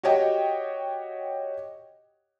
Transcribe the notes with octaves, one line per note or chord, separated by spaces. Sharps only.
F#4 G4 C#5 D#5 G5